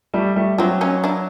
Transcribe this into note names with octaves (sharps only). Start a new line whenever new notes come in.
G3 A3
G3 A3
F#3 C4 D4
C#4 D#4
D4 E4